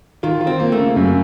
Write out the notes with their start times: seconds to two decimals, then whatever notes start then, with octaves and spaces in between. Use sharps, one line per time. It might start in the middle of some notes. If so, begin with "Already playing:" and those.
0.23 D#3 F4
0.41 F4
0.47 C4
0.60 A#3
0.72 A3
0.78 C#3
0.96 F#2